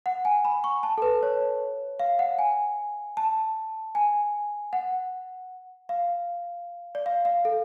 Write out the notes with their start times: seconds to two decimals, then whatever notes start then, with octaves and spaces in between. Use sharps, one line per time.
0.06 F#5
0.25 G#5
0.45 B5
0.64 C#6
0.83 A5
0.98 A4
1.02 B4
1.23 C#5
1.99 F5
2.19 F#5
2.39 G#5
3.17 A5
3.95 G#5
4.73 F#5
5.89 F5
6.95 D5
7.06 F5
7.25 F5
7.45 A4